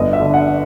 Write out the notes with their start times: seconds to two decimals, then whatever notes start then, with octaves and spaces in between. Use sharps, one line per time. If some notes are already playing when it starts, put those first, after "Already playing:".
Already playing: G1 D#5
0.13 E5
0.20 D3
0.34 F#5